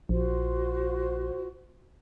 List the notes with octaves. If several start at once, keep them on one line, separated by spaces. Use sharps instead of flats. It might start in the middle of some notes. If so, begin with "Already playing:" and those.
A#1 F4 F#4 C5